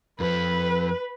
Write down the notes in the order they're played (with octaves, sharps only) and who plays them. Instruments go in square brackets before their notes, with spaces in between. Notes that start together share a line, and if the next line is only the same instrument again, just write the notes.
[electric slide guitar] F2 F3 [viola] B4